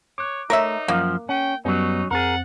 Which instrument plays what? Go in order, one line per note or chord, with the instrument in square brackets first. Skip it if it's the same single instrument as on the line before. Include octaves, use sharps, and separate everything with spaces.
[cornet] C#5 [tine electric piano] D6 F#6
[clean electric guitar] A3 [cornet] D#4 [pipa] A#4 C#5 E5
[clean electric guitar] F#2 F3 [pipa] A#3
[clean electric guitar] C#4 [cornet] G5
[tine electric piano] F#2 G3 B3 [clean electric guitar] F#3 C#4 [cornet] D#4
[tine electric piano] F2 C4 A6 [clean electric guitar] G#4 A#4 [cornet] F#5